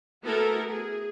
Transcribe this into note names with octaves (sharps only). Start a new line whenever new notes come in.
A3 B3 E4 F#4 A4 A#4
G#4